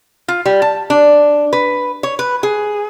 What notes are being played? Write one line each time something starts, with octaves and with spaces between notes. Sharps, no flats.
F4
G3
A5
D4
B4
C#5
B4
G#4